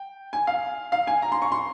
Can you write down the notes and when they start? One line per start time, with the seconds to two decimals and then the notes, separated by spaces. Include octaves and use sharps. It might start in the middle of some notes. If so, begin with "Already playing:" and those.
Already playing: G5
0.33 G#5
0.47 F5
0.92 F5
1.07 G#5
1.22 A#5
1.32 C6
1.42 C#6
1.52 C6